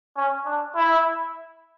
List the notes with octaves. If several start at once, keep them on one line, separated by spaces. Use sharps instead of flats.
C#4
D4
E4